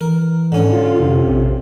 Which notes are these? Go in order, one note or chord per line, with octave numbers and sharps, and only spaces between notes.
E3 A#4
G#2 D3 C#4
F4
F2 C3
A#1